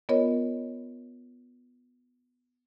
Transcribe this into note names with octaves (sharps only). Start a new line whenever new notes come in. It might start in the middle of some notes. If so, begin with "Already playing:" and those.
B3 F4 A#4 C#5 D#5